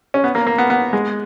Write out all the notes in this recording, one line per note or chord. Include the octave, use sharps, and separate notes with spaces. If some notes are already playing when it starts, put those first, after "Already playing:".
C#4
B3
A#3
A#3
B3
B3
G#3